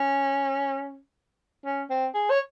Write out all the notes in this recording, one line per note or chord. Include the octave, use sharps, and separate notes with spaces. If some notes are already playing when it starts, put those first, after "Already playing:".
Already playing: C#4
C#4
C4
G#4
C#5